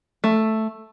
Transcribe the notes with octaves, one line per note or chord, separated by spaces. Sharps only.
A3